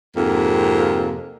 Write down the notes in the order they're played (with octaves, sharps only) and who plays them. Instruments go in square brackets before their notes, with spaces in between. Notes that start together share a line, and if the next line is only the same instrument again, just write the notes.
[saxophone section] F2 G#2 C3 A#3